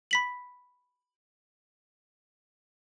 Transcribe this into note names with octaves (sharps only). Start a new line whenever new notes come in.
B5 B6 F#7